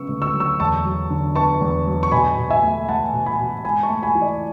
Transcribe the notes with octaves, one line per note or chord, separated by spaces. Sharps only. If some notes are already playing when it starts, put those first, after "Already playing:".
Already playing: C#3 F#3 B3 C#6 E6
D2
C#6 E6
F#3
C#6 E6
E2 A5 C#6
F#3
D3
B3 A5 C#6
E2
F#3
C#6
B2 G#5 B5
B2
E5 G#5
A3
A3 F#5 A5
B2
G#5 B5
B2
G#2 G#5 B5
A5 C#6
A3
G#5 B5
E3
D5